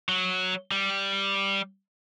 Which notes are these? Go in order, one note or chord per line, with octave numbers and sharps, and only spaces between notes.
F#3
G3